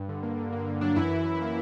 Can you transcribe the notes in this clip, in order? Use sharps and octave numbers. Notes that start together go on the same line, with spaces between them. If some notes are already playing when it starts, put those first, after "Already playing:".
Already playing: G2
D3
A#3
D3
A#3
D3
F#3 D4
F#2 E3 E4
F#2
E3
A#3